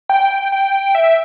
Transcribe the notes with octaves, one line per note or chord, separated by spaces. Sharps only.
G5
G5
E5